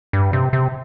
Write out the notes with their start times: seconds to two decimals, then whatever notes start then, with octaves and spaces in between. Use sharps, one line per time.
0.13 G2
0.33 C3
0.53 C3